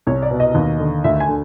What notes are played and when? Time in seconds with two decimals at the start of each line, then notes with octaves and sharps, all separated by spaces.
0.07 C2 C#5
0.22 D5
0.31 B2
0.40 D#5
0.55 D#2
0.80 D3
1.04 D2 E5
1.20 G#5
1.29 D3